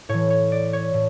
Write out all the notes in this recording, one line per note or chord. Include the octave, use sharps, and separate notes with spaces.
A2 E3 C#5
C#5
D5
C#5
A2